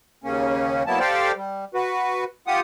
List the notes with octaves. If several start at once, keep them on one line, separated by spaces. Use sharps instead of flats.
D#2 C#3 A#3 C#4
F#3 A#3 B3 E4 A5
G4 A4 C5 D5 F5 G5
G3
F#4 B4
F4 G4 F#5 D#6